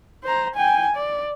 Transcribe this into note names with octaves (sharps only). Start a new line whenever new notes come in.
C5 A#5
G5 G#5
D5